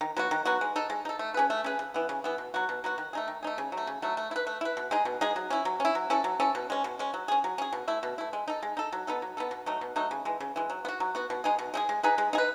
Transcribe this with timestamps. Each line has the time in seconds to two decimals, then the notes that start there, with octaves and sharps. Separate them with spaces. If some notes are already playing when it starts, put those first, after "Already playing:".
0.01 D#3
0.17 F#3 B3 F#4
0.31 D#3
0.45 F#3 B3 F#4
0.61 G#3
0.76 D#4 A4
0.90 G#3
1.05 D#4 A4
1.19 A3
1.34 C#4 G#4 B4
1.50 A3
1.64 C#4 G#4 B4
1.79 C#3
1.94 E3 B3
2.09 C#3
2.24 E3 B3
2.38 B2
2.54 F#3 B3 F#4
2.69 B2
2.84 F#3 B3 F#4
2.98 D#3
3.13 A3 D#4 G#4
3.28 D#3
3.43 A3 D#4 G#4
3.58 C#3
3.72 F#3
3.77 A3
3.87 C#3
4.02 F#3 A3
4.17 A3
4.31 E4
4.36 B4
4.47 A3
4.61 E4 B4
4.77 B2
4.91 G#3 D#4 G#4
5.05 B2
5.21 G#3 D#4 G#4
5.36 F#3
5.50 C#4 E4
5.65 F#3
5.80 C#4 E4
5.95 F#3
6.10 C#4 E4 A4
6.24 F#3
6.40 C#4 E4 A4
6.55 B2
6.70 G#3 C#4
6.84 B2
6.99 G#3 C#4
7.14 F#3
7.28 C#4 G#4
7.44 F#3
7.58 C#4 G#4
7.73 B2
7.88 A3 E4
8.03 B2
8.18 A3 E4
8.33 G#3
8.48 D#4 A4
8.63 G#3
8.77 D#4 A4
8.92 F#3
9.07 B3 D#4 A4
9.22 F#3
9.37 B3 D#4 A4
9.51 B2
9.66 F#3 A3 D#4
9.81 B2
9.96 F#3 A3 D#4
10.11 C#3
10.25 E3 G#3
10.41 C#3
10.56 E3 G#3
10.70 F#3
10.85 B3
10.88 F#4
11.00 F#3
11.15 B3 F#4
11.30 B2
11.44 G#3 D#4 G#4
11.59 B2
11.74 G#3 D#4 G#4
11.89 G#3
12.03 D#4 G#4 B4
12.18 G#3
12.33 D#4 G#4
12.38 B4